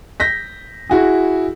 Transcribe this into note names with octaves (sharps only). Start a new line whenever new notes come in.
G6 A#6 B6
E4 F#4 G#4